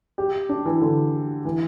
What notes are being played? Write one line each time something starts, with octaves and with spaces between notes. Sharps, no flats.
G4
D4
E3
D3
E3